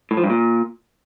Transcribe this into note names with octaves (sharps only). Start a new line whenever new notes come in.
A2
F3
G2
A#2